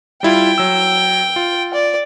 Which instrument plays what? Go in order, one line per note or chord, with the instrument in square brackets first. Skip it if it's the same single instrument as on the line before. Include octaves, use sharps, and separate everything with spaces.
[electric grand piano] G3 E4 F4 [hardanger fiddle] G5
[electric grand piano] F#3 E6
F4
[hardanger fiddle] D5